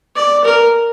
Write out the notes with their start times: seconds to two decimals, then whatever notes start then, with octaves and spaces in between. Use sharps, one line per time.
0.16 D5
0.45 A#4